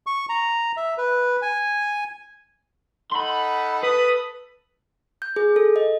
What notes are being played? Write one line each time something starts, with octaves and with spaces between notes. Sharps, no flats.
C#6
A#5
E5
B4
G#5
D#4 A4 F#5 B5 C6
A4 B4 D#6
G6
G#4
A4
D#5